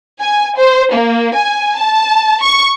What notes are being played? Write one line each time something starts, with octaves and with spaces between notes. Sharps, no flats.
G#5
C5
A#3
G#5
A5
C#6